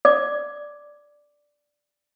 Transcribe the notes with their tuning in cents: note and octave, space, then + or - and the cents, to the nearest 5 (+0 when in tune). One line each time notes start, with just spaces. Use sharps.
D5 +0 D6 +0